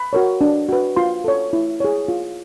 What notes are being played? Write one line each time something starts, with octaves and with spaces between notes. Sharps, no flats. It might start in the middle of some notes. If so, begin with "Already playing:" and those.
Already playing: B5
F#4 A#4 C#5
D4
F#4 B4
F4 C6
A4 C#5
E4
G#4 C#5
F4